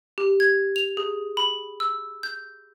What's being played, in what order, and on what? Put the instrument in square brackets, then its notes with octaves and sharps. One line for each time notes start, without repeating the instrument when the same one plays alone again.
[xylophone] G4
G#6
F7
G#4
B5
E6
G6